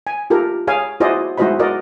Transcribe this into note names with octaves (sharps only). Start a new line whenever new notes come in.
G#5
F4 G4 A4 A#4
G#4 C#5 F5 G#5
E4 F#4 G#4 C5 D5 D#5
G#3 E4 F#4 C5 D#5 B5
F#4 A#4 D5 D#5